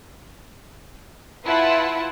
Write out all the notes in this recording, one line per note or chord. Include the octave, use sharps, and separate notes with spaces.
E4 F4 B4 E5 F#5 A5